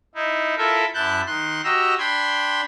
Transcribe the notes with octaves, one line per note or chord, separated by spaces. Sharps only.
D#4 E4
E4 F4 A4 A#4 E5
F#2 E4 A5 F#6 G6
D#3 C6 F#6
F#4 G4 D#5 A#5 E6
D4 G5 B5 C6 G#6